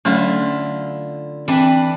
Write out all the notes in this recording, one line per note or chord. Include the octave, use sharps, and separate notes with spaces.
D3 F#3 A3 C#4 E4 F4
E3 C4 D4 B4